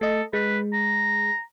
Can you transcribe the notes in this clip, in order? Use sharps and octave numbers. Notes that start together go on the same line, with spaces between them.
A3 A4 D#5
G#3 B4
A#5